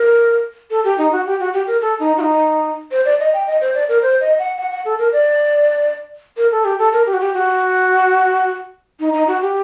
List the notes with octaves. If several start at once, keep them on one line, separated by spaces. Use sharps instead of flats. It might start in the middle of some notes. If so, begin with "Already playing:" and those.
Already playing: A#4
A4
G4
D#4
F#4
G4
F#4
G4
A#4
A4
D#4
F#4
D#4
C5
D5
D#5
G5
D#5
C5
D5
A#4
C5
D#5
F#5
F#5
F#5
A4
A#4
D5
A#4
A4
G4
A4
A#4
G4
F#4
G4
F#4
D#4
D#4
F#4
G4